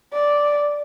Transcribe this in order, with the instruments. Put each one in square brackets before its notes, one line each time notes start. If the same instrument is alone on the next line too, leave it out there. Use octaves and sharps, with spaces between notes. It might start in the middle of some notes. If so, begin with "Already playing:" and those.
[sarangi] D5